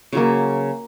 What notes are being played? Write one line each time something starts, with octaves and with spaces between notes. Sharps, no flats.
C#3 F#3 A#3